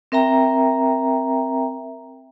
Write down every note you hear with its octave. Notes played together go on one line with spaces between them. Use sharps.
C4 A#4 E5 G5 A#5